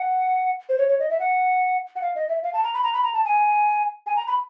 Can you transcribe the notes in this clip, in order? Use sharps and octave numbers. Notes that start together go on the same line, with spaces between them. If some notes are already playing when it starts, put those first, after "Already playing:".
Already playing: F#5
C5
C#5
C#5
D#5
E5
F#5
F#5
F5
D#5
E5
F5
A5
A#5
B5
A#5
B5
A#5
A5
G#5
G#5
A#5
B5